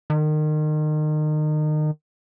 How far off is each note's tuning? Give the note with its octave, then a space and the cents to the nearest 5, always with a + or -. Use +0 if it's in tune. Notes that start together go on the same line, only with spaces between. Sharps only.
D#3 -30